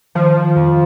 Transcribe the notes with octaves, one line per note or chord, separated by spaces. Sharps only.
D#3 F3
F2